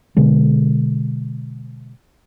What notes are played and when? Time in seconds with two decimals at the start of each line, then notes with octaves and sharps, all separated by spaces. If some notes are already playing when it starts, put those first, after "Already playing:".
0.17 B2 D3 G#3